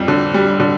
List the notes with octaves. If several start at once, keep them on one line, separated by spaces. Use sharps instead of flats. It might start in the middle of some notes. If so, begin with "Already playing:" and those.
Already playing: F2 G3
D3
G3
D3